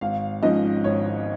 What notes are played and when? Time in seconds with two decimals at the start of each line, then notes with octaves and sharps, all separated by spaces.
0.01 G#1 F5
0.43 G#2 F3 C#4 D#5
0.84 G#1 C#5